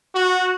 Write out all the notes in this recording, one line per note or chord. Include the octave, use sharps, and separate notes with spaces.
F#4